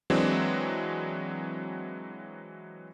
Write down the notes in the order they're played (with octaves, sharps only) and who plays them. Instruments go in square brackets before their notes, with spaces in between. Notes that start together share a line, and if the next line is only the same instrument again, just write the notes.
[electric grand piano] E3 F#3 G#3 C4 D4